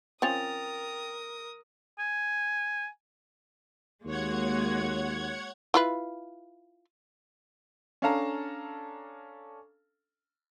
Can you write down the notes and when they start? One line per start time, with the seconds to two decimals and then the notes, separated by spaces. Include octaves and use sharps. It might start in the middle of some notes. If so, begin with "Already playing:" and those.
0.22 F3 C4 C#4 A#4 G5 D#6 A6 F7
1.99 G#5
4.06 D#2 G#3 A#3 F#4 C#5 F#5 G#6
5.74 E4 F4 B4
8.02 C#4 D4 A4 F5 A5 A#5